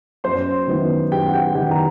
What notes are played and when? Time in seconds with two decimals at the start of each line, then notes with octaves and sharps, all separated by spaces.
0.24 F#2 C5 C6
0.67 D#3 F#3 B3 E4
1.11 F#2 G4 G5
1.28 F#5
1.34 G4 G5
1.55 D#3 F#3 B3 E4 G4 G5
1.71 A#5